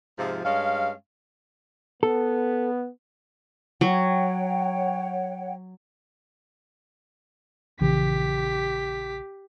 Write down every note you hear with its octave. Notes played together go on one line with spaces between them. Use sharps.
G#2 C3 F3
G2 G#3 C#4 F5
B3 A4
F#3 C#5 F#5 G5
A#1 C#3 E3 G4 B6